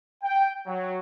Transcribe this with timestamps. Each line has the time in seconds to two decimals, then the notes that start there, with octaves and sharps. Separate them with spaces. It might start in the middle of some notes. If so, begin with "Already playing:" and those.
0.23 G5
0.67 F#3